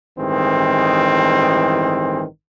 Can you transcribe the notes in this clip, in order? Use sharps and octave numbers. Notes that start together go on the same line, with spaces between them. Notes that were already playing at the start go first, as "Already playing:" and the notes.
A1 G2 D#3 E3 G#3 C4